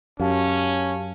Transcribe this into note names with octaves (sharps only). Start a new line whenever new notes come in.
F#2 C#4 G4 F5 A5